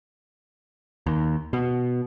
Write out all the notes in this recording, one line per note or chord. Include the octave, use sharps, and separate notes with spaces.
D#2
B2